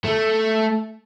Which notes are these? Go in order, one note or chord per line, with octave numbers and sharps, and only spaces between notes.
A3